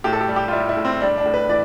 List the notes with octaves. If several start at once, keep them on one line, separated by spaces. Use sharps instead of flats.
A2 G4
A4
G4
G3
G4
F4
G3 E4
E4
A2
C4
G3 D4
D4
A2
B4
E3 D5